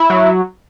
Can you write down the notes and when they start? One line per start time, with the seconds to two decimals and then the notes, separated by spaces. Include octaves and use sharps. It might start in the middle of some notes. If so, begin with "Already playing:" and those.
Already playing: E4
0.10 F#3